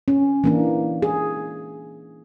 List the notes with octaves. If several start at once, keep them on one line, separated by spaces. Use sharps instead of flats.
C#4
E3 A#3 D4
G#4